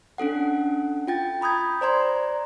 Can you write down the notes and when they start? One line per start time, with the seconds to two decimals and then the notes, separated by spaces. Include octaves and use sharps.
0.18 C#4 D4 A4 F#5
1.08 F4 G5 A6
1.41 A#5 B5 D#6 G6 G#6
1.81 C5 D5 A#5 C6